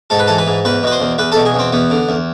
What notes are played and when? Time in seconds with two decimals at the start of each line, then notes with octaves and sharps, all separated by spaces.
0.10 G#2 A4
0.19 B4
0.27 E3 A4
0.38 B4
0.47 G#2
0.65 E2 B4
0.83 B2 B4
0.92 C5
1.00 E2
1.18 E2 B4
1.32 A4
1.36 B2
1.45 G#4
1.54 E2 C4
1.72 E2 B3
1.90 D3
2.09 E2